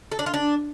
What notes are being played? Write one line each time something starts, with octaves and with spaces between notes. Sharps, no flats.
A4
D4
F4
D4